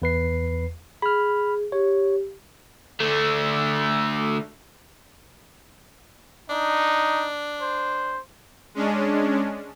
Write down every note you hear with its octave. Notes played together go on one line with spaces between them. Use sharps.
E2 B4 C7
G#4 B5 F6
G4 C#5
D3 A3
D4 D#4
C5
G#3 C#4 D4